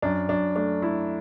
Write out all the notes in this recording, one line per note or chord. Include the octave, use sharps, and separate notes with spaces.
F#2 D4
F#2 D4
A3 D4
A3 E4